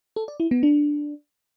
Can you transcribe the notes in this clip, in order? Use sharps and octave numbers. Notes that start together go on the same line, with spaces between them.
A4
D5
E4
B3
D4